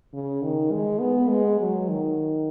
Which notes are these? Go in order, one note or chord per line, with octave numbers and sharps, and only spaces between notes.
C#3
D#3
G#3
B3
G#3
F#3
D#3